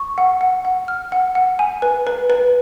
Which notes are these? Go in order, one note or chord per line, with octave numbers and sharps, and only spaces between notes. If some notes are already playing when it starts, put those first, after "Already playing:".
Already playing: C#6
F#5
F#5
F#5
F6
F#5
F#5
G#5
B4
B4
B4